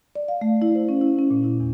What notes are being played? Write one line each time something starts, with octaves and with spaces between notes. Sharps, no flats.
D5
F5
A3
E4
C5
C#4
E4
C#4
A#2
E4
E2